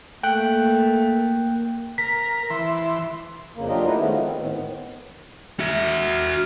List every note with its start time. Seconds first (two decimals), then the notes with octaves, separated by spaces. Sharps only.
0.23 A3 A#3 G5 F#6
1.98 A#4 B6
2.50 E3 C6
3.56 F2 C#3 A#3
3.69 F#3 D4 F4 G4 A#4 D#5
3.86 A3 D#4 E4 F#4 B4
3.99 D#3 F3 G#3 A3 B3 C#4
4.22 C4
4.40 A2 D#3 B3
5.59 F#4 E5